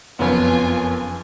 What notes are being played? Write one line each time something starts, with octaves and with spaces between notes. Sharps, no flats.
F#1 F2 B3 C#4 F4 B4 G#5